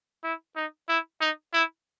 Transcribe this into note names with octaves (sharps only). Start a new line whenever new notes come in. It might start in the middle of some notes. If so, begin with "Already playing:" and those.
E4
D#4
E4
D#4
E4